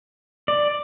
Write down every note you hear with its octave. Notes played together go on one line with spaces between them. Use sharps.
D5